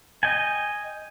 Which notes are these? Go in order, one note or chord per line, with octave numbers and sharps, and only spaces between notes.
D#5 G5 G#5